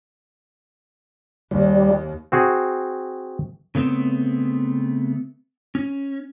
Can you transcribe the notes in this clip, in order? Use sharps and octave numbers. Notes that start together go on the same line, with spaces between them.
D#2 G3
C4 F#4 G#4
C#3 A3 B3 C4
C#4